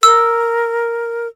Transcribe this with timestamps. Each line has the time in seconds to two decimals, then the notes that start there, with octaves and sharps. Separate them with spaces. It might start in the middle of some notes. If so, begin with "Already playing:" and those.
0.03 A#4 E6